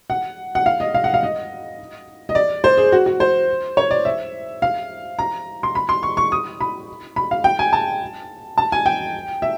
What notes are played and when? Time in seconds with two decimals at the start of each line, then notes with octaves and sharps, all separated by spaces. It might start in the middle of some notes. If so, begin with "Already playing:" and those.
0.10 F#5
0.55 F#5
0.66 F5
0.80 D#5
0.94 F5
1.04 F#5
1.14 F5
1.23 D#5
2.29 D#5
2.35 D5
2.64 C5
2.78 G#4
2.92 F#4
3.06 F#4
3.20 C5
3.77 C#5
3.91 D5
4.05 E5
4.62 F5
5.19 A#5
5.63 C6
5.75 B5
5.89 C6
6.03 C#6
6.17 C#6
6.32 D#6
6.61 B5
7.16 B5
7.31 F5
7.44 G5
7.59 G#5
7.73 A5
8.58 A5
8.72 G#5
8.86 G5
9.42 E5